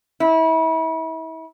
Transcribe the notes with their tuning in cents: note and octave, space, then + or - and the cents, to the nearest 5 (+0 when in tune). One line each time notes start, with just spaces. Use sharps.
E4 -35